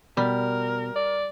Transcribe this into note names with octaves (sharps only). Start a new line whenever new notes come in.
B2 G3 A#4
D5